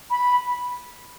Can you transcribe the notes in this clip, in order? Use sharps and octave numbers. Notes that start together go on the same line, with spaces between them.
B5